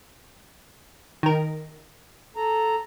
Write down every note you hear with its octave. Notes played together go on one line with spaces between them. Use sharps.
D#3 A#4
A4 A#5